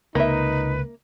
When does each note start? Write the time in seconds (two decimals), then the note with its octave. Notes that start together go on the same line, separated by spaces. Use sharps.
0.15 C#2 C3 A#3 D#4 B4 E5